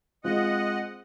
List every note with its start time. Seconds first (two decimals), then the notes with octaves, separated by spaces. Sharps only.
0.24 G#3 C4 F4 D#5 F#5